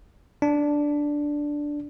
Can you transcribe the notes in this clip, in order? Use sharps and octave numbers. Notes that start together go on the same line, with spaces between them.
D4